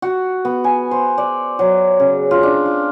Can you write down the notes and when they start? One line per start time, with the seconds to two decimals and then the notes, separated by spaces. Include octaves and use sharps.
0.02 F#4
0.45 B3
0.64 G#5
0.91 C5
1.18 D5
1.59 F#3
2.00 C#3
2.31 F4
2.43 D4
2.66 F4